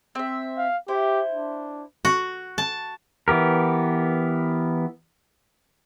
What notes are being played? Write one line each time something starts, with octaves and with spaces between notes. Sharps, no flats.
C4 E5
F5
E4 G4 C5
D4
F#4
A5
E3 B3 G4 A#4